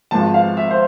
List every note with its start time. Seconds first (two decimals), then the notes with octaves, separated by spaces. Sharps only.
0.11 G#1 G#2 F3 A5
0.34 F5
0.57 E5
0.70 C5